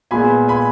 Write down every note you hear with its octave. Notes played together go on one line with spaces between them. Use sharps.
A#2 G#3 B3 G#5 B5
G#5 B5